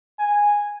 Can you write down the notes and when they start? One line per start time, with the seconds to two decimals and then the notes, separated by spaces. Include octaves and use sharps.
0.19 G#5